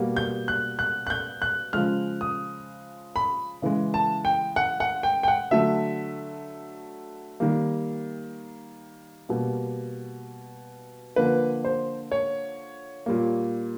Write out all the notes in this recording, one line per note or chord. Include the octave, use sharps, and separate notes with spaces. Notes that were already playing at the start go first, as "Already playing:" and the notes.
Already playing: B2 G3 A#3
G6
F#6
F#6
F#6
G6
F#6
C#3 F3 G#3 F6
D#6
B5
C#3 E3 G#3
A5
G5
F#5
F#5
G5
G5
F#5
D3 F#3 A3 E5
D#3 G3 A#3
B2 G3 A#3
D3 F3 A#3 B4
C5
C#5
A#2 G3 A#3